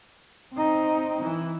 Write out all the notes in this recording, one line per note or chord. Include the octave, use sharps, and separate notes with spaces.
C4 D#4
E3